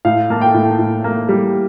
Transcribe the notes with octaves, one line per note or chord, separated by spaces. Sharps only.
A2 F5
A#3 A5
G5
A2
A2
A#3
G3